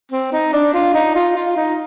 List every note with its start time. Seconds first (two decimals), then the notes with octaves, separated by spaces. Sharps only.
0.12 C4
0.33 D#4
0.53 D4
0.74 F4
0.94 D#4
1.15 F4
1.36 F4
1.56 D#4